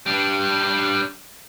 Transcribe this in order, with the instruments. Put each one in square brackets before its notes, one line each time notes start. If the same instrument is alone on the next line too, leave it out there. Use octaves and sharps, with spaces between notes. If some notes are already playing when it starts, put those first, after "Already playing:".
[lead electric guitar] G3 D4